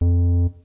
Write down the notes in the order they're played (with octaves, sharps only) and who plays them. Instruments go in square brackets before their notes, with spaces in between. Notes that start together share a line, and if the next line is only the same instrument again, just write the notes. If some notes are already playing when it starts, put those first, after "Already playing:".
[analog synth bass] F2